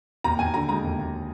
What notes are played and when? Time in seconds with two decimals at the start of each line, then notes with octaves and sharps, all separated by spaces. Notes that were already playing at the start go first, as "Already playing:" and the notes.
0.24 D#2 A#5
0.39 D#2 G#5
0.54 D3 A#5
0.69 G#3 A#5
0.84 D#2
0.98 D#2